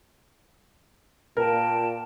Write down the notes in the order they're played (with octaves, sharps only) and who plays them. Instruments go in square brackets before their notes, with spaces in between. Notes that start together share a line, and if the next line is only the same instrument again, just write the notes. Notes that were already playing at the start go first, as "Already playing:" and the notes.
[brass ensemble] A#2 [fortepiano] A#4 [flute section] G5 A5